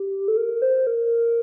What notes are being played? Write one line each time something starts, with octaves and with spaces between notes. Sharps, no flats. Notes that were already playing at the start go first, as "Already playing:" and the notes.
Already playing: G4
A4
A#4
C5
A#4